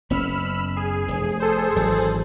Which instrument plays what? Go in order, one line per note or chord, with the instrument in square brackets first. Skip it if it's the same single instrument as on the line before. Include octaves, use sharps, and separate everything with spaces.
[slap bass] F#1 B3 C#4 [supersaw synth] B5 E6 F6
[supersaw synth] G#4
[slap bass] F1
[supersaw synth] G#4 A4 C5
[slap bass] G#1 E3 F#3